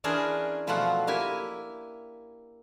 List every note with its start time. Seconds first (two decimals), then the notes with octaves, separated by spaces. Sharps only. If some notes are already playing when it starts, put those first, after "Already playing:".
0.04 E3 C#4 D4 G#4 A#4 C5
0.67 B2 F3 F#3 A3 F4 F#5
1.07 A#3 E4 G4 G#5